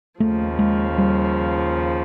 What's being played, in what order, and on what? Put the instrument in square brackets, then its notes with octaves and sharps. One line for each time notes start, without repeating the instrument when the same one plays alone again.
[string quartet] D#2 C#3 F3 [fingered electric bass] A3
[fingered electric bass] G#3
G3